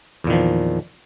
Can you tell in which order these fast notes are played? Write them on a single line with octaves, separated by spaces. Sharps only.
E2 A#2 D#3 F3